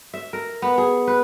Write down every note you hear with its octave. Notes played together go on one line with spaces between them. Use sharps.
E5
A#4
B3
G#4
B4